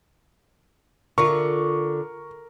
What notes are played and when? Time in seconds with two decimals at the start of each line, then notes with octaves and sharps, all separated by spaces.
1.18 D3 F4 A#4 C#6